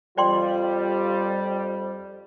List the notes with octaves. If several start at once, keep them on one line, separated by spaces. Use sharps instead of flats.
F2 G3 F4 D5 G5 C6